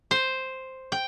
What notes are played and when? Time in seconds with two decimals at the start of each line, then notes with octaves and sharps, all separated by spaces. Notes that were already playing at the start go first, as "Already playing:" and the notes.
0.11 C5
0.92 G5